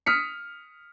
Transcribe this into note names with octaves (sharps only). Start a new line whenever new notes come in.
D#6 F6 B6 C#7